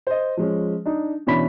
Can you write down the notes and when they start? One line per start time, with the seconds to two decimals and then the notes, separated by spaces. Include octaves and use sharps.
0.07 C5 D#5
0.37 F3 G#3 C#4
0.86 D4 D#4
1.27 B2 E3 C#4 D4 B5 B6